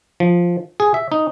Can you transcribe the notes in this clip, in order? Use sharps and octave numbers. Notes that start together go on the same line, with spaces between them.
F3
G#4
E5
D#4